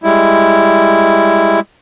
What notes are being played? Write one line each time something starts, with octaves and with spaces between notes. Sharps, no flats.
G3 G#3 E4